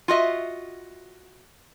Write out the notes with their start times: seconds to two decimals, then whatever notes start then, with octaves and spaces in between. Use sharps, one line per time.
0.08 F4 F#4 D#5 E5